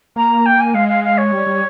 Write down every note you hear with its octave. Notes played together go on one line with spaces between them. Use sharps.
A#3 A#5
G5
G#5
G#3 F5
F5
F5
C#5
G3
G3